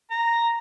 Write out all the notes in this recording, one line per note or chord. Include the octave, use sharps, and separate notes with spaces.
A#5